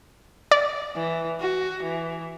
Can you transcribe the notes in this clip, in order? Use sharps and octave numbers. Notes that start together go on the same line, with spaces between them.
D5
E3
F#4
E3